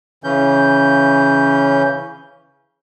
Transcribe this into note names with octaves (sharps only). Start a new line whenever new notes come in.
C#3 E3 C#4 G6